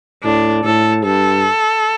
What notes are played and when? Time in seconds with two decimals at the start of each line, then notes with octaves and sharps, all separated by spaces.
0.23 A2 D4
0.64 A2 A4
1.05 G2 A4